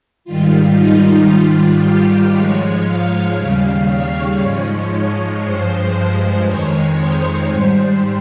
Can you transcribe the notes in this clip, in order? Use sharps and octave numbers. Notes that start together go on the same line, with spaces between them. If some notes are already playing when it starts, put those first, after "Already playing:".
G#2 D#3 G3 F4
D#4
G#2 D#3 G3 F4
G4
G#2 F3 G#3 C#5
F5
D#2 C#3 G3 F5
C#5
G#2 F3 G#3
G2 F3 G#3 C5
C5
F2 D#3 G#3 C#5
C5
G#2 G3 C5